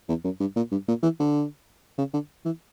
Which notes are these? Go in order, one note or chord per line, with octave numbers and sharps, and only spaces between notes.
E2
F#2
G2
A#2
G2
A#2
E3
D3
C#3
D3
E3